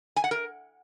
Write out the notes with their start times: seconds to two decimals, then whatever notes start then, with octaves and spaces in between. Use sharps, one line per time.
0.16 G#5
0.24 F#5
0.31 A#4